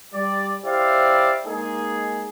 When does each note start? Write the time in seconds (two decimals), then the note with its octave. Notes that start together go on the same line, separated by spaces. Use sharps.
0.14 G3 D5
0.65 E4 G4 C5 D5 E5 F5
1.46 G#3 A#3 D#4 G#4